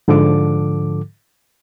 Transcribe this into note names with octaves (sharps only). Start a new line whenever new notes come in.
G#2 D3 F3 A4 D6